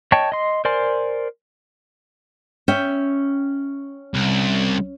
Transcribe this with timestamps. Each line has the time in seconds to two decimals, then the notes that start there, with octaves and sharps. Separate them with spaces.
0.12 C#5 D#5 G5 A5 C#6
0.32 D#5 C6
0.65 A#4 C5 D5 G#5 C6
2.68 C#4 E5 G5
4.14 C2